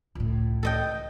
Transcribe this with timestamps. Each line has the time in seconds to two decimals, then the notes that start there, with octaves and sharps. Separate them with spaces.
0.15 C#2 A2
0.63 A4 D#5 G5